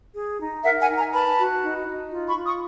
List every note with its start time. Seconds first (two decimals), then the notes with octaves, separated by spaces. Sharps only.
0.14 G#4
0.40 D#4
0.63 A#4 E5 F#5
0.80 F#5 G#5
0.88 D#4
0.96 G#5 A#5
1.12 B4 A5 B5
1.38 F#4
1.62 D#4
1.87 D#4
2.12 F4
2.28 B5 C#6
2.36 F4
2.44 C#6 D#6